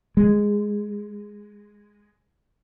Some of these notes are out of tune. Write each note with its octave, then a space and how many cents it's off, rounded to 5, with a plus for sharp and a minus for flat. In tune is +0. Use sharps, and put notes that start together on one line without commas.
G#3 -5